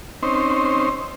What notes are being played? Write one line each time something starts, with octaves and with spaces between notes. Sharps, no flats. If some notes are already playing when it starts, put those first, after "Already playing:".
C4 C#4 D#4 C5